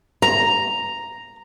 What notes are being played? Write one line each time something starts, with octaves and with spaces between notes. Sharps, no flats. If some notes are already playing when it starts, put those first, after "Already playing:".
A#5